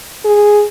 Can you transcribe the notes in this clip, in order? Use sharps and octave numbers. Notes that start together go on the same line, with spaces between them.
G#4